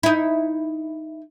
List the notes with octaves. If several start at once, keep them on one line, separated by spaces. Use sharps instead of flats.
D#4 E4